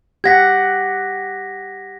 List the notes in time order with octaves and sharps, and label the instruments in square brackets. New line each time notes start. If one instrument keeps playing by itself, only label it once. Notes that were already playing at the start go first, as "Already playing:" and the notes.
[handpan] G4 F#5 [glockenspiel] G#6 A#6 B6